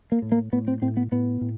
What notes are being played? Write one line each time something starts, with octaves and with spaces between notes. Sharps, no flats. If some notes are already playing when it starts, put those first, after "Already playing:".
A#3
A2
A#3
A2 B3
C4
A2 C4
B3
A2 B3
A2